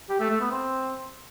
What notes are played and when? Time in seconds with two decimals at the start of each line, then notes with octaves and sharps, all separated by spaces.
0.10 G4
0.20 A3
0.30 A3
0.41 B3
0.51 C4